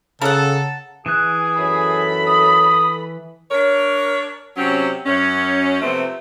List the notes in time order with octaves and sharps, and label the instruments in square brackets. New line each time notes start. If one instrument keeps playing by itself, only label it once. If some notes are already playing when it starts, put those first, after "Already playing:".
[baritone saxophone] C#3 [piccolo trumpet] A4 [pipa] A#4 F#5 [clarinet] A5
[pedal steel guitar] E3 F#6 [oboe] G#4
[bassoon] F#2 [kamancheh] A4 B5
[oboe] D#6
[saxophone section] D4 A#4 C#5
C3 F#3 C4 C#4
F#2 C#4
C3 F3 A3 B3 C4